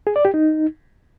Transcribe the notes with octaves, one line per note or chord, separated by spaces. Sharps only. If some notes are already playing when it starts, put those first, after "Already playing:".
G#4
D5
G4
D#4